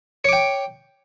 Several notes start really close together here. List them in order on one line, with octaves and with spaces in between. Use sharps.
C#5 D6 G5